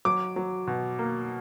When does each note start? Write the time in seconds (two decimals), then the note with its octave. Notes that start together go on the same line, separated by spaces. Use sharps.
0.05 F#3 D6
0.36 F#3
0.67 B2
0.99 A#3